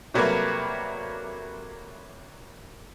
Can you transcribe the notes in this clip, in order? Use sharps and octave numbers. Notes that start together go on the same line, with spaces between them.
C3 F#3 G3 A3 A#3 B4